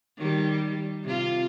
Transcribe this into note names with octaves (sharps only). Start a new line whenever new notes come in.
D#3 G3
C3 F4